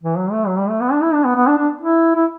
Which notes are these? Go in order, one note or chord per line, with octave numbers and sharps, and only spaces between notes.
E3
F#3
A3
F#3
G3
A3
B3
D4
E4
D4
B3
B3
D4
D4
E4
E4